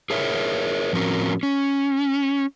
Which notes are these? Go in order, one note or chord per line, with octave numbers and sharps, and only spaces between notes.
G#4 A#4 C#5 E5
A2 F3 C4 C#4 F#4 A#4
C#4